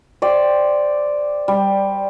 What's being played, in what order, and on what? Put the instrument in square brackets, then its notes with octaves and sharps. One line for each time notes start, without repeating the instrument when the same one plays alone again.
[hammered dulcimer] C5 D5 G5
G3